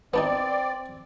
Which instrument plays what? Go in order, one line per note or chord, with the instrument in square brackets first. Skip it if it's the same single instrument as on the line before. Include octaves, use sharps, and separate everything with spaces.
[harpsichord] B3 D4 D#4 [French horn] C4 [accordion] D5